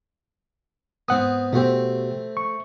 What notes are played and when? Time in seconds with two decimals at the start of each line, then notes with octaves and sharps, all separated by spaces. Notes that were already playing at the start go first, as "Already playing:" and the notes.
1.08 G#2 B3 C4 F#5 D#6
1.53 B2 A3 C4 F#4 G4
2.37 C#6